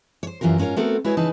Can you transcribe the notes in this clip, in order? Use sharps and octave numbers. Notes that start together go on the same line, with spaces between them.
C5 C#5
F#2 E3 F4 G4 A#4
G#2 C#4 F4 A#4 A#5
A3 B3 C4 F#4 A4 A#4
G#3 E4 F#4 G#4 B4 C#5
C#3 E3 D#4 G#4 B4 A5